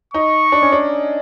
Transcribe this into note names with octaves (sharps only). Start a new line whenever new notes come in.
D#4 C#6
D4
C#4
D4